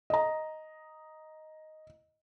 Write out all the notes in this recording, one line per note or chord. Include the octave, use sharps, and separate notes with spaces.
D#5 A#5